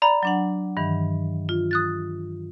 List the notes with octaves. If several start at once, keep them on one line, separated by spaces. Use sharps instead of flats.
D5 A#5 B5
F#3 D4 F#5
G2 D#3 E3
F4
D#6 F#6 A6